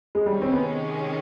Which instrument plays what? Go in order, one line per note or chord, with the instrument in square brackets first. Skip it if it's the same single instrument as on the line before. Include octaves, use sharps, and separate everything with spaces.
[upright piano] G#3
[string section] C3 D#3 G#3 C#4 [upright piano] G3
[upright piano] C4
B3